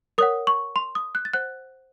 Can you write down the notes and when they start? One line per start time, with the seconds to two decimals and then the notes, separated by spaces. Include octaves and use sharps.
0.18 A#4 C#5 F#5 D#6
0.47 C#6
0.76 C6
0.95 D#6
1.15 F#6
1.25 A6
1.33 C5 F#5 F#6